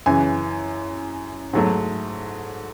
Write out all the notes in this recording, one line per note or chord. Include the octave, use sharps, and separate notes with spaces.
F#2 C#3 E3 G#5
G#2 F#3 A3